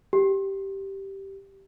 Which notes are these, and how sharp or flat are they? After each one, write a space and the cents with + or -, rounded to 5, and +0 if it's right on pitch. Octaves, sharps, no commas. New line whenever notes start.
G4 -10